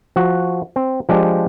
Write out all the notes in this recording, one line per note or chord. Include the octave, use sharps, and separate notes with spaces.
F3 F#4
C4
F3 G#3 D4 G4